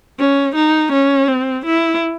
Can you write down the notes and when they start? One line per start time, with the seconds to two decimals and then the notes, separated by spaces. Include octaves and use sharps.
0.19 C#4
0.56 D#4
0.92 C#4
1.28 C4
1.65 E4